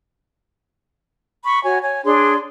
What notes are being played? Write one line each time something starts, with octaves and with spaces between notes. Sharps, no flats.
B5 C#6
F#4 C#5 G#5
C#5 G#5
D4 G#4 C#5 C6